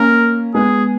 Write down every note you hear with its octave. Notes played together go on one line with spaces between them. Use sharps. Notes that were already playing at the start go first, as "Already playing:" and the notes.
Already playing: A#3 C#4 A#4
G#3 B3 G#4